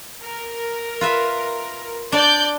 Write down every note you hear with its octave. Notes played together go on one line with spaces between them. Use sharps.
A#4
F4 B4 E5
D4 D5 G6